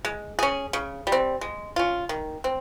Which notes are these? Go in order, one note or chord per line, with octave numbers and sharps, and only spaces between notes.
G#3
C#4 G#4
C#3
G3
C4
G#3
C#4 F4
D#3
C4